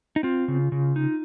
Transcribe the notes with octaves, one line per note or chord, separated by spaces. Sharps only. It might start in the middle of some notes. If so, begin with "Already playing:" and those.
D#4
C4 F4
C#3
C#3
D#4